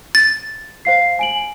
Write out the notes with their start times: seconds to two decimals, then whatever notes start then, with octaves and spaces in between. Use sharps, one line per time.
0.15 A6
0.85 C5 F5 C7
1.19 G#5 D7 F#7